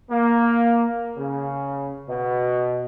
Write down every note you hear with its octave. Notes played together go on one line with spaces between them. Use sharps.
A#3
C#3
B2